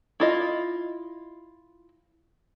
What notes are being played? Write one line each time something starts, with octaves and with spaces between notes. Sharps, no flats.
E4 F4 D#5